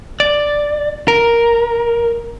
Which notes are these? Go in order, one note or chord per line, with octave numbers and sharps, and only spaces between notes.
D5
A#4